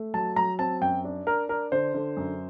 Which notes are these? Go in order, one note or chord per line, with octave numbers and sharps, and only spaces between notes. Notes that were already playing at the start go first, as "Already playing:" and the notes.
Already playing: A3
F#3 A5
F#3 A#5
C4 A5
F#2 G5
D4
D4 A#4
D4 A#4
D3 C5
D3
F#2